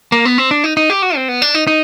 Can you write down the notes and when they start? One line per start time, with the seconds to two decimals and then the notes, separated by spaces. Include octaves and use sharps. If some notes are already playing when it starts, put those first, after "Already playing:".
0.12 A#3
0.25 B3
0.38 C4
0.51 D4
0.64 D#4
0.77 D#4
0.90 G4
1.02 F#4
1.16 C4
1.29 B3
1.42 D4
1.55 D#4
1.67 D#4